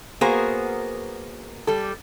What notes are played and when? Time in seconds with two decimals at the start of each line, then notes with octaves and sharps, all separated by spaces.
0.21 A#3 B3 F#4 G#4 A#4 C5
1.67 G3 A4